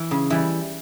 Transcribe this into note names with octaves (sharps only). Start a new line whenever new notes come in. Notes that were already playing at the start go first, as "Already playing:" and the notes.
Already playing: E3
C#3
E3 G3